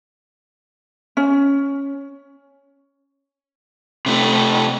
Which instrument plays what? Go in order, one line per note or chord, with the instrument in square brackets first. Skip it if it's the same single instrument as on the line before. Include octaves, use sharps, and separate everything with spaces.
[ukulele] C#4
[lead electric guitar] C3 A3